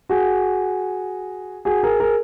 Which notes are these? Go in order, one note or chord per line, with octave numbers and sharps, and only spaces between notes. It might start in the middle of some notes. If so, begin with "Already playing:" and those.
F#4 G#4
F#4 G#4
G#4 A#4
G#4 A#4